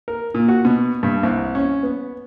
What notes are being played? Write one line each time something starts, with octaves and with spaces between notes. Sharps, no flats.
A#4
A#2
F#4
B2
G2
C2
C#4
B3